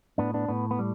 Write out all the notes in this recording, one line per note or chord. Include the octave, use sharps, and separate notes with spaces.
A2 B3 D4
B3 D4
A2 B3
B3
G3